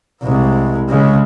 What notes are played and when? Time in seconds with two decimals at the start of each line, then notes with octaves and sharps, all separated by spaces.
0.23 C2 G#3
0.89 C#3 G#3